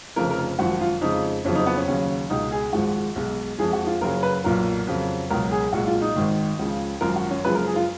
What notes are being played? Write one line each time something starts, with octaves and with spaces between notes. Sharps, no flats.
F1 F2 C#3 F3 A#4
A#4
G#1 F#2 F3 F#4
F4
F2 C#3 G#3 D#4
F#1 F2 C#3 F#3 C#4
D#4
B3
C#4
D#2 C#3 F#3
C#2 B2 G#3 D#4
G#4
G#1 G#2 F3 G#3 F#4
B1 B2 G#3
F2 F3 G#3 G#4
F#4
F4
F#1 F#2 C#3 F#3 A#4
B4
B1 A#2 F#3 A#4
F2 C#3 F#3
C#2 B2 F#3 A#4
G#4
B1 A#2 G#3 F#4
F4
D#4
G#1 G#2 D#3
C#2 C#3 F3
G#1 F#2 F3 A#4
F#4
C#4
F#1 F#2 F3 G#3 B4
A#4
G#4
F4